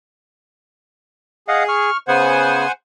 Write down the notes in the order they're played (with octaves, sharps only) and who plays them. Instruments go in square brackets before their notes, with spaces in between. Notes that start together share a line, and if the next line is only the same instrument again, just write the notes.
[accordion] G#4 [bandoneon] D#5 F5 F#5
[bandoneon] C#6 F6
[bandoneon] C#3 B3 [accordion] C5 F#5 G#5